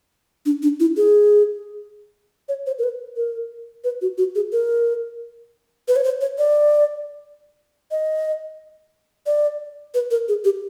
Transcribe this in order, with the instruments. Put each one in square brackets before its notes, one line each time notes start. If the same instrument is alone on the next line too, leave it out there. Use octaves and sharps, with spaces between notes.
[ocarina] D4
D4
E4
G#4
C#5
C5
A#4
B4
A#4
B4
F#4
F#4
G#4
A#4
B4
C#5
C5
C#5
D5
D#5
D5
B4
A#4
G#4
G4